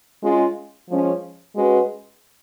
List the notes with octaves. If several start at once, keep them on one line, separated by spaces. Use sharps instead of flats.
G#3 C#4 F4 G#4
F3 G#3 C#4
G#3 C#4 F#4 B4